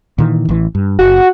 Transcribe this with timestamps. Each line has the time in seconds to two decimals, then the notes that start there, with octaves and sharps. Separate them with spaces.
0.18 A#2 D#3 E3
0.49 A1 E3
0.75 G2
0.99 F#1 F#4